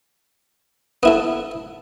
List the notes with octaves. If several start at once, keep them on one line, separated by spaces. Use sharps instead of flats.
B3 E4 A4